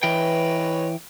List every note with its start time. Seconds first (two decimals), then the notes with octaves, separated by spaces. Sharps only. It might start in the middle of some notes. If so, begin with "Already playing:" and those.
0.03 E3 B4 C#5 D#5 G5